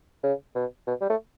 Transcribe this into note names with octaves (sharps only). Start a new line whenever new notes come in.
C#3
B2
B2
G3
A3